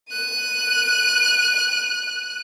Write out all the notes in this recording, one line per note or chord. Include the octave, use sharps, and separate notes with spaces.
F#6 D#7